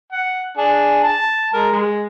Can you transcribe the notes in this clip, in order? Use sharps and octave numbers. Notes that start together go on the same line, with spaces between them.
F#5
D4 G#4
A5
G#3 A#4
G#3